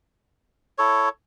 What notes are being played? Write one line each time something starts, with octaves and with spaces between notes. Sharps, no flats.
E4 A4 C#5